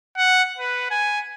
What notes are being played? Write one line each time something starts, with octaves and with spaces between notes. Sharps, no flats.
F#5
B4
G#5